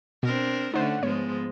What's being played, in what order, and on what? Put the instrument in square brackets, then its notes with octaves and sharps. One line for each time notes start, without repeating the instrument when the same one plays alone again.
[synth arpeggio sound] B2 [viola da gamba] C4 D4 A#4
[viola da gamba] D3 A3 C#4 [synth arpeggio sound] D#4 C5 [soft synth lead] F#5
[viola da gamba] G#2 F3 G#3 [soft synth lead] B3 [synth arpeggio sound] C#5